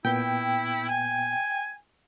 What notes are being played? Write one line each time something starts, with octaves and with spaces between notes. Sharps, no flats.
A#2 B3 E4 G5
G#5